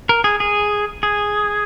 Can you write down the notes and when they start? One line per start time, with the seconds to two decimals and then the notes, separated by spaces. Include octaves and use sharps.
0.09 A#4
0.24 G#4
0.40 G#4
1.03 G#4